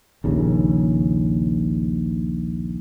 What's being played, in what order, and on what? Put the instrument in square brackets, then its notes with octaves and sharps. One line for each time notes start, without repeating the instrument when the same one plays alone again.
[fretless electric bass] A#1 D#2 C#3